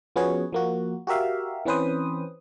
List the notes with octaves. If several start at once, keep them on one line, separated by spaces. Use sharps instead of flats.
F3 B3 C#4 F#4 G#4 C#5
F3 A#3 F#4
F#4 G4 A#4 E5 F5
E3 C4 C#4 B4 C5 D#6